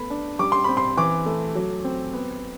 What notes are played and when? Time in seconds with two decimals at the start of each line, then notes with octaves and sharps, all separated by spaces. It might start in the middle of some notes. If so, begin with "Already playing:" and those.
Already playing: A3 B3 B5
0.10 D4
0.39 G3 D6
0.52 C6
0.64 C4 B5
0.77 C6
0.97 E3 D6
1.26 A3
1.55 F#3
1.84 C4
2.13 B3